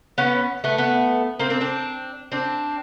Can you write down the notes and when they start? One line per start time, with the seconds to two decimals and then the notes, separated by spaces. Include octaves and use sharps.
0.18 B3 C#4
0.64 A3 B3
0.78 A3 B3
1.39 A#3 C4
1.50 C4 D4
1.61 C4 D4
2.32 C4 D4